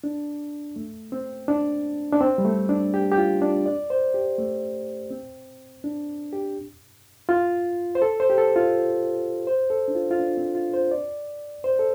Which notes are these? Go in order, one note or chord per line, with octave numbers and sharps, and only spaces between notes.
D4
A3
C4
D4
D4
C4
G3
A3
D4
G4
G4
F4
D4
D5
C5
G4
A3
C4
D4
G4
F4
C5
A4
C5
G4
A4
F4
C5
A4
D4
F4
F4
D4
C4
F4
C5
D5
C5
A4